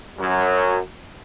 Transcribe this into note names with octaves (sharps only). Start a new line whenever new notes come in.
F#2 F#3